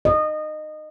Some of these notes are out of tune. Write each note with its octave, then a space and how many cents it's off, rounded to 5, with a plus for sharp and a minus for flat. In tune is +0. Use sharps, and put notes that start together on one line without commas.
D#5 -20